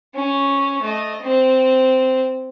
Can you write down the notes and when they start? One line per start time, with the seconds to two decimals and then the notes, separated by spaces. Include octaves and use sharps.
0.14 C#4
0.82 A3 D#5
1.22 C4